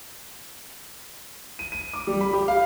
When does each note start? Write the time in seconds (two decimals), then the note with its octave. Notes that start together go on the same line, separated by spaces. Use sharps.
1.59 D#7
1.72 D#7
1.93 D6
2.07 G3
2.21 B5
2.33 G4
2.48 F5